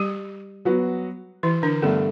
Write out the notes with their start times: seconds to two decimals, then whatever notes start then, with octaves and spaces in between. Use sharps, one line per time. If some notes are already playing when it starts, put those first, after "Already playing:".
Already playing: G3 G4
0.65 F#3 B3 F#4
1.43 E3 E4
1.63 D3 D4
1.82 G2 D3 A3 B3